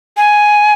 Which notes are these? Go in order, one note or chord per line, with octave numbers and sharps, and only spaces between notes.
G#5